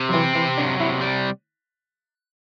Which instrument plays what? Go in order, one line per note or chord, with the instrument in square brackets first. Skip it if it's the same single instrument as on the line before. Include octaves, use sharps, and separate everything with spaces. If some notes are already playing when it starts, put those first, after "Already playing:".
Already playing: [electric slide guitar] C3
[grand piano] F#3
[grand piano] E3 [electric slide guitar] C4
[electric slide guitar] C3 [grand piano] E3
[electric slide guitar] F#3 [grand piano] D4
[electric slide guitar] C3 [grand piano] E4
[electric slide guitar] G3